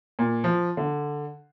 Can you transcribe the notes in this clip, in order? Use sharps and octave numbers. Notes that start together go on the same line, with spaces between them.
A#2
F3
D3